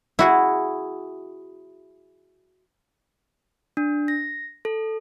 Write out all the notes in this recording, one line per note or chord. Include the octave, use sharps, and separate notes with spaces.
E4 F#4 G#4
D4
A#6
A4